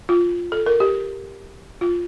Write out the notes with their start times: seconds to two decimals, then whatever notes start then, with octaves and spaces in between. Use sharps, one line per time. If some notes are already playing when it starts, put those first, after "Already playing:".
0.09 F4
0.52 A4
0.66 A#4
0.80 G4
1.81 F4